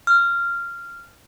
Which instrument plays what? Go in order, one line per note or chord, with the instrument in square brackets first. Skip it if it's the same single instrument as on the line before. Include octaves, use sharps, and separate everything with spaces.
[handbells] F6